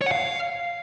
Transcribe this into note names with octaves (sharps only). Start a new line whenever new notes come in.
C#5
F#5
F5